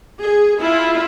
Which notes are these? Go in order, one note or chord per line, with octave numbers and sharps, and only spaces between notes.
G#4
E4 F4